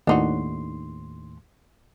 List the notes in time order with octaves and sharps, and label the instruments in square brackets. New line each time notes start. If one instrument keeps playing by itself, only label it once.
[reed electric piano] D#2 A2 C6 [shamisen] D4 D#4 F#4